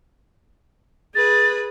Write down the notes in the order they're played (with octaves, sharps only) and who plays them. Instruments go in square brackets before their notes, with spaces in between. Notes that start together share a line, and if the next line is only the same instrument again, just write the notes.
[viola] G#4 B4 [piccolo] A6